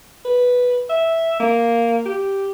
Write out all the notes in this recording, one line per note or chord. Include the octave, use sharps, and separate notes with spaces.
B4
E5
A#3
G4